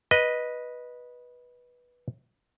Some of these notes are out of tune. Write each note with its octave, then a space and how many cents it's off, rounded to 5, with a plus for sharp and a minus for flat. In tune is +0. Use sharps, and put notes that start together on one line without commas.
B4 -10 D#5 +0